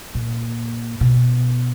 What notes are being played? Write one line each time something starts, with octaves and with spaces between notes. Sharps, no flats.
A#2
B2